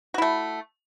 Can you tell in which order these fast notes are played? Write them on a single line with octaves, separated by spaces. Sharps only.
F#4 E4 A3